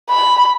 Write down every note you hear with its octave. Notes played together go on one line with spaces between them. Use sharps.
B5